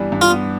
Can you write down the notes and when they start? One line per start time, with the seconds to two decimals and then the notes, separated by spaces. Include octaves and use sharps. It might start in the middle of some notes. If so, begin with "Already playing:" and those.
Already playing: G2 E3 G3 B3
0.12 G2
0.21 F4
0.30 B3